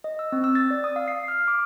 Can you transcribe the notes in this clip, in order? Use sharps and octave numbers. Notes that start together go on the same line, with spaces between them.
D#5
E6
C4
E6
A6
D5
D#6
F5
C7
F6
D6